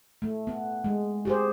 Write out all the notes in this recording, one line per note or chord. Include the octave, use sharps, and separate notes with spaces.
A3
B3
G#3
G4 G#4 C5